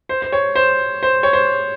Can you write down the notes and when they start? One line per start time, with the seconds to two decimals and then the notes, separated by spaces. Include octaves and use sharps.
0.09 C5
0.22 C5
0.32 C#5
0.55 C5
1.03 C5
1.23 C#5
1.33 C5